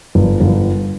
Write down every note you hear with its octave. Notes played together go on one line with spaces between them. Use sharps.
G1
G1